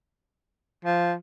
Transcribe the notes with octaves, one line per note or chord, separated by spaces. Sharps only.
F3